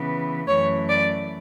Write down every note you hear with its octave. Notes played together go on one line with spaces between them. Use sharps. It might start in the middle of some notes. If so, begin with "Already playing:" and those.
Already playing: C#3 E3 B3
F#2 E3 A3 C#5
D5